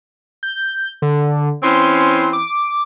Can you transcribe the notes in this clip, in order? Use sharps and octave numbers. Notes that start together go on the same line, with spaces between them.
G6
D3
E3 C4 C#4 C6
D6